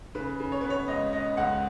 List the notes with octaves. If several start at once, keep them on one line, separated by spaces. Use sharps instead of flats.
C#3 B4
C#3
C#5
B3 B4
C#5
C#2 D#5
B3 D#5
C#2 F#5